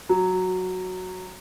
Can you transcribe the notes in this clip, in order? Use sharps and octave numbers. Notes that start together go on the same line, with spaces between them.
F#3